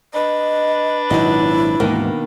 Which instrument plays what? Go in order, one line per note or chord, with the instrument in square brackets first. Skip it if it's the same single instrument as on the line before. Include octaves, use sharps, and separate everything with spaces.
[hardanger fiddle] D4 B4 [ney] D#5
[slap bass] G#1 A#2 F#3 [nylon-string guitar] D#4 F#4 D#5 [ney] E4
[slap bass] D2 G#2 E3 [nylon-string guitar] B2 D#3 A#3